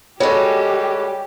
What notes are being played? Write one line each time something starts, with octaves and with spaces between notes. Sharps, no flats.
G3 G#3 F#4 G4 A4 C#5